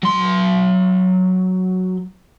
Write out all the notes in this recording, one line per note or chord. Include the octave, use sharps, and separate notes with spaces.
F#3 C6